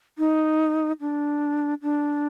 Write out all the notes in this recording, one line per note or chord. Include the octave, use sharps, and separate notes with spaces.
D#4
D4
D4